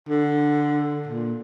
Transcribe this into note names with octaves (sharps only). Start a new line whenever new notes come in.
D3
A#2